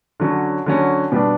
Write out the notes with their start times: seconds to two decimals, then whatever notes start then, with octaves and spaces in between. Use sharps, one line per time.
0.20 D3 F#3 C#4
0.66 D3 F#3 C#4
1.12 B2 G3 D4